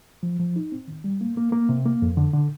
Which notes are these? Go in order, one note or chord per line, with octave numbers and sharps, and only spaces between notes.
F3
F3
D#4
C4
D#3
G3
A#3
A#3
A#3
C3
A#3
F2
D3
D3